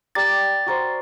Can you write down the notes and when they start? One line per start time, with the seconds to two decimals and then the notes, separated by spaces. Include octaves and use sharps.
0.15 G4 A#4 D5 A6
0.66 F#4 A#4 C5